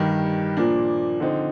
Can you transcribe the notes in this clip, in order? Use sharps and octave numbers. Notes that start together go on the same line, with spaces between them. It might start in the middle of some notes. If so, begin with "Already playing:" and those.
Already playing: G2 D#3 G3
A#2 F3 A#3 D4
D3 F3 C4 D#4